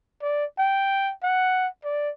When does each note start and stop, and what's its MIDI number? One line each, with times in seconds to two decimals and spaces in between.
0.22 0.45 74
0.59 1.12 79
1.23 1.68 78
1.84 2.10 74